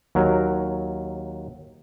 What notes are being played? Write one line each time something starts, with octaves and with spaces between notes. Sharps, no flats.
D#2 F#3 A#4